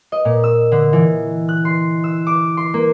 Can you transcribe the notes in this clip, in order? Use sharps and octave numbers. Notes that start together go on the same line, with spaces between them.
D#5
A#2
E6
D3
E3
F#6
C6
E6
D6
C6
A#3